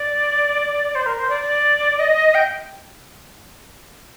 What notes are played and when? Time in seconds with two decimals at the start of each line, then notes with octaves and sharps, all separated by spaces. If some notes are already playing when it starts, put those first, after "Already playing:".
Already playing: D5
0.95 C5
1.06 A#4
1.18 C5
1.29 D5
1.99 D#5
2.34 G5